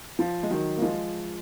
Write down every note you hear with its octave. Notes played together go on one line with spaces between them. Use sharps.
F3
G#3
D#3 F#3
A#3
F3 G#3